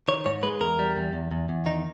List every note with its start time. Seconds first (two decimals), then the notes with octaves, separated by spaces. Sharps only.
0.08 D#3 C#5
0.26 G#2 C#5
0.43 G#3 B4
0.60 E2 A#4
0.79 G3
0.96 E2
1.13 E2
1.31 E2
1.49 E2
1.66 D#3 D#4